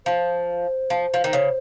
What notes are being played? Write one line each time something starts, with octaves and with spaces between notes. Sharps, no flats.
F3 C5
F3
F3
D#3
C#3